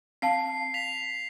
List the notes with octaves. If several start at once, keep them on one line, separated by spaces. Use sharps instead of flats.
C4 F5 A5 C7
B6 F7